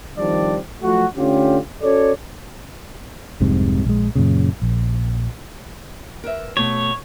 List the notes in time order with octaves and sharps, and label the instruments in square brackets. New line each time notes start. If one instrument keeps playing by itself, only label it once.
[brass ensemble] D#3 F3 G3 C4 D4 D5
F3 F#3 A3 F#4
D3 A3 C#4 F4 G4
C#4 F#4 A4 C#5 D5
[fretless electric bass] F1 C2 G#2 C3
A#1 G#3
F#2 A#2 C#3
A#1
[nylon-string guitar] A#4 B4 E5
[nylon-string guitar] B2 A3 [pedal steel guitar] C#5